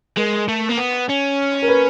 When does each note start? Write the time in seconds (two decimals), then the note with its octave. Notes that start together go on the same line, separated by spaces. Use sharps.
0.17 G#3 A#4
0.48 A3
0.69 A#3
0.78 B3
1.09 C#4
1.62 A#4
1.68 B4